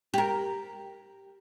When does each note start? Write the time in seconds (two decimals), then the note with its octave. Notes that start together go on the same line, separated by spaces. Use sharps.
0.14 G4 A#4